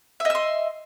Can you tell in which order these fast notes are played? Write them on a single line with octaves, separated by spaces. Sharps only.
E5 D#5 E6 C6